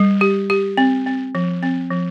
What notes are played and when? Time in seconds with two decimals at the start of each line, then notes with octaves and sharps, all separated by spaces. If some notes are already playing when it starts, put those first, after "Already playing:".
Already playing: G3
0.21 G4
0.50 G4
0.77 C4
1.06 C4
1.35 F3
1.63 C4
1.91 F3